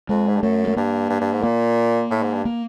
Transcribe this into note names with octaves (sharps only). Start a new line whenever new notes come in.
F2 G#3
G#2
G2
F#2 A3
A3
G2 A#3
G2
G2
G#2
A#2 A#3
A2
G#2
G2
A#3